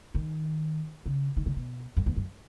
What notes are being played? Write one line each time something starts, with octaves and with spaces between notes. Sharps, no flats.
D#3
C#3
D#3
C#3
B2
F#2
E2
F#2